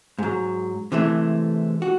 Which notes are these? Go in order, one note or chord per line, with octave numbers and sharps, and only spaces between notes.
G#2 F#3
C3 E3 G#3 A3
F#4